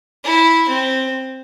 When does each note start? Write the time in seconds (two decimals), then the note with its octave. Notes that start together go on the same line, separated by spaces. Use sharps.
0.24 E4
0.69 C4